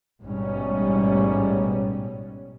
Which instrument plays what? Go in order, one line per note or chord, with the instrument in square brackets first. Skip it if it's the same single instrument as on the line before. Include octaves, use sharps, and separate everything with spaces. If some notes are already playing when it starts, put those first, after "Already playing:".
[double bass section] A1 G#2 B2 G3 C#4